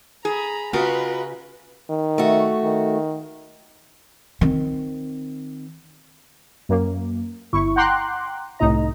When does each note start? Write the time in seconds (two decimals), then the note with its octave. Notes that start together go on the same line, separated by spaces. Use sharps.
0.25 G#4 A#5 B5
0.73 C#3 F4 F#4 A#4 B4 D#5
1.90 D#3
2.18 A3 F#4
2.64 D#3
4.41 D#3 C4
6.69 F#2 A#3
7.53 G1 E4 C#6
7.76 F#5 G5 A#5 C6 D6 F#6
8.59 C2 A2 D#4 D#5 A#5